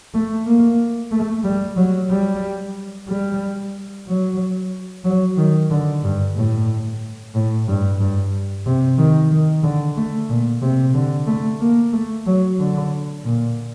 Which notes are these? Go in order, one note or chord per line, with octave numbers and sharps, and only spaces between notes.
A3
A#3
A3
G3
F#3
G3
G3
F#3
F#3
D#3
D3
G2
A2
A2
G2
G2
C3
D#3
D#3
D3
A3
A#2
C3
D3
A3
A#3
A3
F#3
D3
A#2